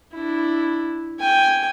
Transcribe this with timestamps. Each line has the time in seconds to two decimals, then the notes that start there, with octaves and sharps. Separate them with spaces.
0.13 D4 E4
1.20 G5 G#5